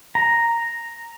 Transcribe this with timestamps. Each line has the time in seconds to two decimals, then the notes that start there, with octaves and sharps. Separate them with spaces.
0.15 A#5